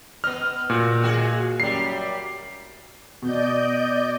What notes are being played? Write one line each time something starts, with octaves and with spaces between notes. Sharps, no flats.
B3 D#5 F6
A#2 F#4
G#3 F#4 G#4
F#2 G3 C7
B2 D5 D#5 G6